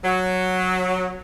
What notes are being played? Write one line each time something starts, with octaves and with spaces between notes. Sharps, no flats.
F#3